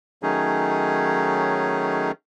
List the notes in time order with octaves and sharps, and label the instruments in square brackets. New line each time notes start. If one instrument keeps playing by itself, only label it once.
[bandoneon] D#3 F#3 A3 C#4 D#4 G#4